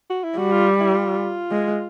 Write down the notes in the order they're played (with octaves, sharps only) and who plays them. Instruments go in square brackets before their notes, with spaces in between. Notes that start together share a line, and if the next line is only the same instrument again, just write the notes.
[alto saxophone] F#4
E4
[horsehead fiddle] G3 [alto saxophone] F#4
[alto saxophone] F4
E4
F4
[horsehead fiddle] G#3